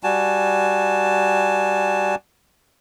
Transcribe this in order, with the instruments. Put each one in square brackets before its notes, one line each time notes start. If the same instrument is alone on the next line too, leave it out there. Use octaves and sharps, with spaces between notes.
[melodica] G3 F#4 G#5 A5